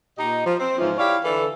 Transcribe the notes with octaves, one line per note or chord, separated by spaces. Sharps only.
A#2 D#4 G4 D#5
F3
C4
G#2 C#3 E3 F3
E4 G4 C#5 D5 F5
D3 E3 D4 A4